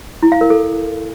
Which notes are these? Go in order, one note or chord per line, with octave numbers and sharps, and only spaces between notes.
E4
F5
A#4
A4